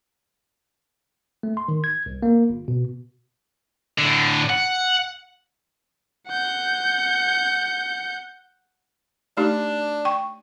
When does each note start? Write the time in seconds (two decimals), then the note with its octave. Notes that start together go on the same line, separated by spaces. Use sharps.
1.43 A3
1.57 C6
1.68 D#3
1.84 G#6
2.06 C2
2.23 A#3
2.50 G1
2.68 B2
3.98 A2 D3
4.50 F#5
6.29 F#5 G6
9.37 A3 D4 D#4 G4
10.05 G5 C#6